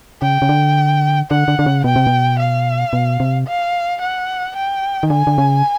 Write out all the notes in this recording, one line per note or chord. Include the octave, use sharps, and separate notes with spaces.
C#3 G5
C#3
D3
D3 F#5
D3
D3
C#3
B2 G5
C3
B2
F5
B2
C3
F5
F#5
G5
D#3
D3 G#5
D3
C#3